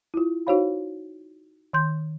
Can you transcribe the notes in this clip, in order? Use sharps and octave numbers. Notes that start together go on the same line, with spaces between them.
E4 F4
D#4 F#4 C5 C#5 F5 B5
D#3 C6 G6